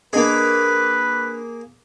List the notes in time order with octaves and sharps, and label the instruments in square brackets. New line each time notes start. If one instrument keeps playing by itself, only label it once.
[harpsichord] A#3 G#4 [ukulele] D4 D#5 [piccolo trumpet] B4